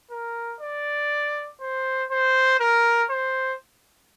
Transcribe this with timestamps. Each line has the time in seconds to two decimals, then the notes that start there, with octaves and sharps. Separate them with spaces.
0.11 A#4
0.60 D5
1.61 C5
2.11 C5
2.60 A#4
3.10 C5